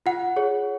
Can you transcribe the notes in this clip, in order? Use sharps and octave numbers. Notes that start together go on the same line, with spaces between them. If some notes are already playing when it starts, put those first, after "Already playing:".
F4 F#5
G#4 C#5